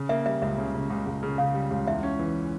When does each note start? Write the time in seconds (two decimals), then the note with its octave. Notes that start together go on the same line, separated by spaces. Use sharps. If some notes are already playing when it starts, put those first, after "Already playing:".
Already playing: C#3
0.09 A#3 E5
0.26 G3 E5
0.42 C#2 E5
0.58 C#3
0.74 C#3
0.90 C#2
1.07 C#2
1.23 C#3
1.38 C#3 F5
1.54 G3
1.71 C#2
1.87 E2 E5
2.03 C#4
2.19 E3